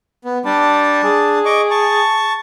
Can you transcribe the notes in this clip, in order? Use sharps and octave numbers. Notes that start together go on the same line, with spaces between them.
B3
G3 D4 A5
G#4
D#5 C#6 D6
A5 C#6